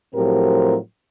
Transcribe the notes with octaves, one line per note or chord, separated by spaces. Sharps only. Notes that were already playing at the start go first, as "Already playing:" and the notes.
A2 F3 F#3 C4 G4 A#4